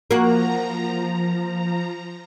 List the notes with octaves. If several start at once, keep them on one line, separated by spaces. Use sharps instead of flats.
F3 A#3 F#4 A#5